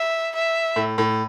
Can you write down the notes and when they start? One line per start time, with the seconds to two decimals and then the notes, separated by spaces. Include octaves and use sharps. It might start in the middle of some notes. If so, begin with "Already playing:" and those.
Already playing: E5
0.35 E5
0.76 A2
0.98 A2